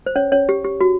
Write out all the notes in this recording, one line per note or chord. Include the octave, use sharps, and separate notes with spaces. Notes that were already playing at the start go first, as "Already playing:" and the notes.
C5
C#4 C#5
C#4 C#5
G4
G4
F#4